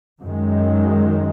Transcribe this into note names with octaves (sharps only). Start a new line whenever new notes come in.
F#2 D#3 G#3